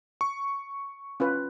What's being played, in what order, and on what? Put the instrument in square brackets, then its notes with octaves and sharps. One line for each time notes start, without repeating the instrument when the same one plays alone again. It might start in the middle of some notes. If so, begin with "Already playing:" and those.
[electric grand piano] C#6
[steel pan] C#4 F4 B4